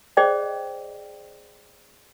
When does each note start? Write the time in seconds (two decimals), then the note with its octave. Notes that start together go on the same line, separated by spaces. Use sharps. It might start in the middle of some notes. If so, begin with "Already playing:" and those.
0.17 G#4 C5 D5 D#5 G5